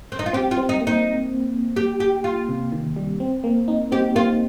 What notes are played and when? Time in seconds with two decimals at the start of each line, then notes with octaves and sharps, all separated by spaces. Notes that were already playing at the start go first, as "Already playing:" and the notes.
0.12 C4
0.19 D#4
0.26 F4
0.33 C4 G4
0.51 F4
0.58 C4
0.69 D#4
0.81 A#3
0.87 D#4
1.76 G4
2.00 G4
2.24 F4
2.49 C3
2.72 D#3
2.96 G3
3.20 C4
3.44 A#3
3.68 D#4
3.92 C4 G4
4.15 A#3 F4